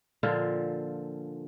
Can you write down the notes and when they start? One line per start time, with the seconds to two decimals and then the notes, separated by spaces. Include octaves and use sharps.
0.23 A#2 D3 F3 F4